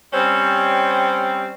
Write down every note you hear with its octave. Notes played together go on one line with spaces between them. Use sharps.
G3 C4 C#4